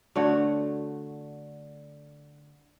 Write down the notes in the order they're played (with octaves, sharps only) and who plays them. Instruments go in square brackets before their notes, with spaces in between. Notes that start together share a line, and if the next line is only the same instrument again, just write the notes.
[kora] D3 A3 F#4 C#5